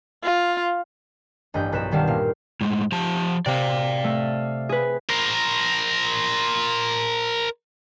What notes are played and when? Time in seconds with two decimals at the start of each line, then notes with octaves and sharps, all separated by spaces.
0.24 F4
1.54 A1 G2 D#5 B5 G6
1.72 B1 B4 B5 A#6 E7
1.91 B2 D#3 G3 F5 A5
2.07 A#2 F5
2.61 A2 G#3
2.92 F3 G4 A5
3.46 C3 D5 F5
4.04 A3
4.69 G#4 B4
5.09 A#4 C5